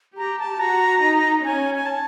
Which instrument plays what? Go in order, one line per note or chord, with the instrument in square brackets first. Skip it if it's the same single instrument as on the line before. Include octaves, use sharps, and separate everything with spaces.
[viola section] G4 [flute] A#5
[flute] A5
[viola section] F#4 [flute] A#5
[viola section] D#4
[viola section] C#4 [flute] G#5
[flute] G#5
A5